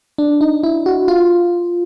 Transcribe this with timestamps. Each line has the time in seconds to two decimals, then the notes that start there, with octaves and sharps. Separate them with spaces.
0.18 D4
0.41 D#4
0.63 E4
0.86 F#4
1.08 F4